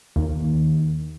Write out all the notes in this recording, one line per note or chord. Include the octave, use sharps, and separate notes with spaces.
D#2